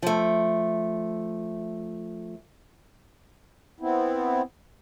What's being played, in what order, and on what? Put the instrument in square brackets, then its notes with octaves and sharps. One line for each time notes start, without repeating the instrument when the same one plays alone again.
[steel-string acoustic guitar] F3 A3
[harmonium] B3 C4 E4